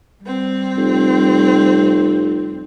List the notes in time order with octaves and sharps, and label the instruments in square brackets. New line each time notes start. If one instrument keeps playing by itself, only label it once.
[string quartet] G3 C4
[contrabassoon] F1